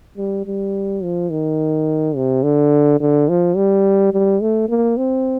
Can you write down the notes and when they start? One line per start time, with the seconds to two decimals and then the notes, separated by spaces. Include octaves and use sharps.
0.17 G3
0.46 G3
1.03 F3
1.30 D#3
2.16 C3
2.43 D3
3.00 D3
3.29 F3
3.56 G3
4.13 G3
4.42 A3
4.69 A#3
4.97 C4